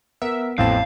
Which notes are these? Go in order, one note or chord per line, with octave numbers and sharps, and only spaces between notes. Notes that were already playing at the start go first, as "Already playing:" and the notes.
B3 A#4 E5
A1 F2 A2 C4 F5 A5